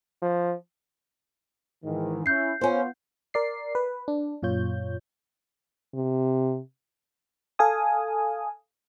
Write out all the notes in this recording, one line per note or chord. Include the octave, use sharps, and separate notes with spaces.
F3
G#2 D#3 E3
C#4 E4 G6 C7
B3 C#4 F4 C5
A#4 D5 C7
B4
D4
F#2 A#2 F4 C#5 G6
C3
A4 F5 G#5 D#6